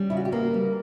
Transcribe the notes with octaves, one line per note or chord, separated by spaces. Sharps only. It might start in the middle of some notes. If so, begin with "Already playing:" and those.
Already playing: G3 C#4
C#3 E4
F#4
G4
C#3 A#3 A#4
G3